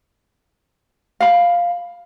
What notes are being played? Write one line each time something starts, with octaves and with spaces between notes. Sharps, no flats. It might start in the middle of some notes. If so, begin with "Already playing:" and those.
F5 B5